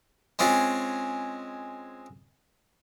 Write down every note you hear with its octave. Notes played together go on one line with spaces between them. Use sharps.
G#3 C4 C#4 F4